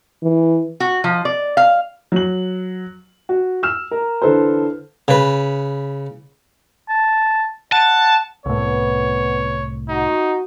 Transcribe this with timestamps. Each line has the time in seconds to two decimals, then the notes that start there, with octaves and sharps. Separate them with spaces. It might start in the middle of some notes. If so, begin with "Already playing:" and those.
0.23 E3
0.80 F#4
1.04 F3
1.25 D5
1.57 F5
2.12 F#3 F#7
3.29 F#4
3.63 E6 F6 E7
3.91 A#4
4.22 D3 E3 A4 B4 C5
5.08 C#3 B4
6.89 A5
7.72 F#5 A5
8.46 C2 A2 B3 C#5
9.89 D#4 F#4